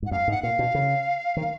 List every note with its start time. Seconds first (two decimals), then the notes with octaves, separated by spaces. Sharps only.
0.02 G#2
0.06 F#5
0.11 F#2 F5
0.28 G#2
0.31 F#5
0.43 A#2 F5
0.59 B2
0.75 C#3
1.37 D#3